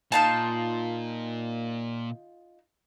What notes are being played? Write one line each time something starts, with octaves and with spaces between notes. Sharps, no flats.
A#2 D#4 F4 A5